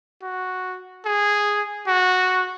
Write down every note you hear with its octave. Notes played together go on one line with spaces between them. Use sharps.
F#4
G#4
F#4